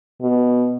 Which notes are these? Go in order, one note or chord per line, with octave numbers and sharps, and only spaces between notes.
B2